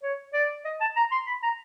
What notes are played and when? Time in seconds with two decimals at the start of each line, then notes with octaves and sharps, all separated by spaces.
0.03 C#5
0.34 D5
0.65 D#5
0.80 A5
0.96 A#5
1.11 C6
1.27 B5
1.43 A#5